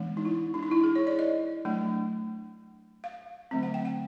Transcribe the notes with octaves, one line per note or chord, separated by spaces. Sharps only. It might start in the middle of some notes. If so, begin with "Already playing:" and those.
Already playing: E3 G#3 B3 D4
D#4
E4
D4
D#4
E4
G#4
C#5
D5
D#5
F#3 A3 D4
F5
D3 F#3 A3 C4
F#5
G5
F#5